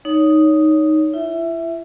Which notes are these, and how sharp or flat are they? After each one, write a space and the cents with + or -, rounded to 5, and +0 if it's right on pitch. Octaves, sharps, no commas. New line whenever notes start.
D#4 +0 C#5 +20
E4 +40 E5 +0